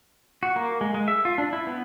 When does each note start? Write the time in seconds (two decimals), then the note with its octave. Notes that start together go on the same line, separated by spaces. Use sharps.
0.43 F#4
0.56 A#3
0.81 G#3
0.94 G#3
1.08 E5
1.25 F4
1.38 D4
1.53 E4
1.67 B3